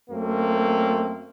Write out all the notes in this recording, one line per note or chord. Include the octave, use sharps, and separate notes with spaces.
F#2 A3 A#3 C4